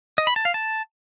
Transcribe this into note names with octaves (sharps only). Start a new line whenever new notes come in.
D#5
B5
A5
F5
A5